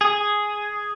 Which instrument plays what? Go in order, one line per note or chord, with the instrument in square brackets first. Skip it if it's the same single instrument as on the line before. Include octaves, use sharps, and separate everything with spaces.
[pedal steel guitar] G#4